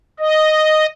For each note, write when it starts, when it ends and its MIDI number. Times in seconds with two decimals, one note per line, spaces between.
0.20 0.86 75